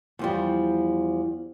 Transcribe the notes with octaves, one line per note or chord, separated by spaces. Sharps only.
E2 F3 G3